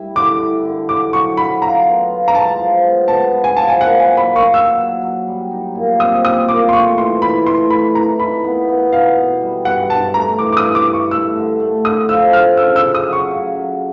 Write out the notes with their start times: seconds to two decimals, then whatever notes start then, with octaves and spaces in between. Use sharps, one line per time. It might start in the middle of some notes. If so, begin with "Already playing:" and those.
Already playing: G3 E4
0.16 D3 D6
0.40 E4
0.65 D3
0.89 F#3 D6
1.13 F#3 C#6
1.37 F#3 B5
1.62 F4 A#5
1.86 B3
2.10 F4
2.28 A#5
2.34 G#3 A5
2.60 F3
2.84 B3
3.08 B3 A5
3.32 B3
3.44 G#5
3.57 F3 A5
3.68 G#5
3.81 A#3 F#5
3.99 G#5
4.05 F#3
4.17 B5
4.30 A#3
4.36 C#6
4.54 F#3 E6
4.79 F#3
5.03 F#3
5.28 G3
5.51 D#4
5.75 A#2
6.00 C4 D#6
6.24 D#4 D#6
6.49 A#2 D6
6.69 C6
6.73 A3 C#6
6.98 E3 C6
7.22 E3 B5
7.46 A3 C6
7.70 A3 B5
7.95 E3 A#5
8.19 D#4 B5
8.44 B3
8.69 B3
8.92 B2 F5
9.17 B2
9.41 G3
9.65 G2 F#5
9.90 G2 A5
10.14 A3 A#5
10.38 E3 D6
10.52 D6
10.57 D#6
10.62 G2
10.75 D6
10.87 G2
10.93 C#6
11.11 A3 E6
11.36 D3
11.60 A3
11.85 D3 D#6
12.08 F3 E6
12.33 D3 F6
12.57 C#3 E6
12.76 E6
12.82 C#3
12.95 D#6
13.07 F#3
13.13 C#6
13.30 C#3
13.55 F#3